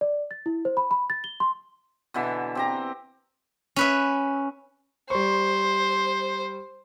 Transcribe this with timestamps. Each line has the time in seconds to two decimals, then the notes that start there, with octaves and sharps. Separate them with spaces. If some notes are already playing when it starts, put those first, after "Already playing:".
0.01 D5
0.31 A6
0.46 E4
0.65 C5
0.77 B5
0.91 B5
1.10 A6
1.24 G7
1.40 C6
2.14 B2 D3 E3 E5
2.55 C4 G4 A#5
3.76 C#4 B4 E5
5.10 G3 C5 C6 C#6